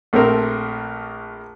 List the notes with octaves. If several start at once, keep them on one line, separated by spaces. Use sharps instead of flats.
A#1 A3 C4 A#4